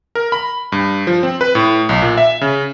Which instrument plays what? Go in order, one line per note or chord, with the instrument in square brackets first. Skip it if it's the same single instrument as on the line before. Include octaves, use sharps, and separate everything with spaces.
[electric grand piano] A#4
B5
G2
F3
C4
B4
A2
B1
A#2
E5
C#3